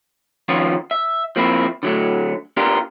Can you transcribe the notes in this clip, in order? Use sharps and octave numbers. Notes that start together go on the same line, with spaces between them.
D#3 F3 B3 C#4 F4
E5
F3 A#3 C4 E4
D3 F#3 A3
B3 D4 F4 G4 A#4